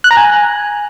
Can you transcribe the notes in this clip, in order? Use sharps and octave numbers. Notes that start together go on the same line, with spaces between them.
F#6
A#5
G#5